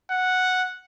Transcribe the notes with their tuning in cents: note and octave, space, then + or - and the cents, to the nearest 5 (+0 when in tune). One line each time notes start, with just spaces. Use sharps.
F#5 -5